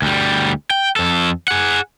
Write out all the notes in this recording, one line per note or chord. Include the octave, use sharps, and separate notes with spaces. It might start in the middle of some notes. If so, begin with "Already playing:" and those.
D2 G3
G5
F2 A4
G#4 F#5